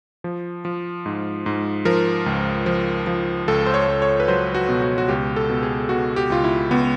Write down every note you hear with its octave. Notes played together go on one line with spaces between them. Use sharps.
F3
F3
G#2
G#2
F3 A#4
C#2
F3
F3
C#2 A4
C5
C#5
C#2
C#5
B4
F#3 C5
F#4
B2
F#4
F#4
C#2 G4
A4
B2
G#4
B2 F#4
G4
C#2 F4
E4
C#2 B3